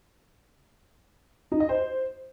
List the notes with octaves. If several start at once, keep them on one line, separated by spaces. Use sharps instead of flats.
D#4
D#5
C5